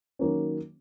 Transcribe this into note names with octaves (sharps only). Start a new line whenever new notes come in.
D#3 F#3 A#3 C#4